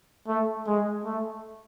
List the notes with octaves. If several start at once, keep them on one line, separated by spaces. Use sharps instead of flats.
A3
G#3
A3